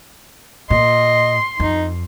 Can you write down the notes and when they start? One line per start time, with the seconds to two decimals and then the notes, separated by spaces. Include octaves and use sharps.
0.70 A#2 D#5 C6
1.60 F2 D#4